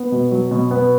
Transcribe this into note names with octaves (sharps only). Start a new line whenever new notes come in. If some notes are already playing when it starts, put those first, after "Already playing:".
Already playing: B3
B2
F#3
B2
B3